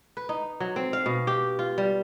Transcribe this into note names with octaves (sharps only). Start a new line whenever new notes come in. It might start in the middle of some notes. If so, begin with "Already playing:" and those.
B4
D#4
F#3
C4
F5
B2
G4
F4
G3